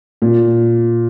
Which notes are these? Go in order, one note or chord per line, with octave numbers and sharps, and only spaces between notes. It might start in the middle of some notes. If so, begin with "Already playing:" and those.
A#2